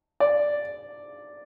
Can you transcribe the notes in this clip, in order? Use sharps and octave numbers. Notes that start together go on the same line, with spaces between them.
D5